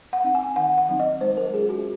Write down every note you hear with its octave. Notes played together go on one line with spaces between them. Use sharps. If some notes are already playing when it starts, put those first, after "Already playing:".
F#5
C4 D#4
G#5
D#3 F#5
F#5
F#3 C4 D#4
D#5
G#3 C5
A#4
C#4 F4 G#4
F#4